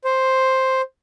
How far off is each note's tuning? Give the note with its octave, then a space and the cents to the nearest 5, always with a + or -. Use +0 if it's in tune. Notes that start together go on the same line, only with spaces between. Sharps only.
C5 +5